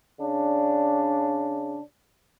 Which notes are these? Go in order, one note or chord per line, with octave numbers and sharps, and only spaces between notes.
C#3 D4